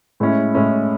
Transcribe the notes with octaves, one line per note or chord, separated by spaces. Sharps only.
A2 G#3 C#4 E4
A2 G#3 C#4 E4